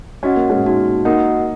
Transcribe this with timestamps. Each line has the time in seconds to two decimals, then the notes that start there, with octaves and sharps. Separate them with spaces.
0.23 C#4 F#4 D#5 F#5
0.36 A#3
0.50 G#3 C#4
0.64 A#3 D#4 F#4
1.05 A#3 D#4 F#4 A#4 D#5 F#5